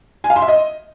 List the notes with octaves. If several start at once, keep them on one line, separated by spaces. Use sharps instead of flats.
G#5
F5
C6
E5
D#5